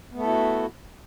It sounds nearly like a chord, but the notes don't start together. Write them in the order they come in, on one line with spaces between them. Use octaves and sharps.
B3 A3 A4 E4 F#4